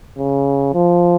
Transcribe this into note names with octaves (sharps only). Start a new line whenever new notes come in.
C#3
F3